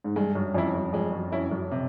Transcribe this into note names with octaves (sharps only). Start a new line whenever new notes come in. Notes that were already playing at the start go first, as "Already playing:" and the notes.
G#2
G2 G#3
F#2
F2 C#4 E4
F#2
F2 G#3
F#2
F#2 C#4 E4
F#2
C3